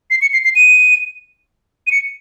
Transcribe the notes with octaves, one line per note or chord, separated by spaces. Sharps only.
C7
C#7
C7
C7
D#7
D#7
C#7